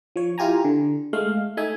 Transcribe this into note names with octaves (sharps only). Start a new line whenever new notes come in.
F3 C#5
E4 F4 G4 G#5 A#5
D3
G#3 A3 F5
A3 D#4 E5 G#5